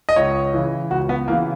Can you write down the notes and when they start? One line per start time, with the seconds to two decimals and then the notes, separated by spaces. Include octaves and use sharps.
0.09 D#5
0.16 C#2 C#5
0.54 C#3 E3
0.91 C#2 F#4
1.09 B3
1.28 C#3 E3 A#3